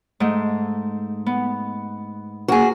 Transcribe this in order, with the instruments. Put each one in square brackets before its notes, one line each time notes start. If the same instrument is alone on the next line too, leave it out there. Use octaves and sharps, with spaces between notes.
[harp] G#2 A3
B3
[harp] A#3 [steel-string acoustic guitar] F#4 G#4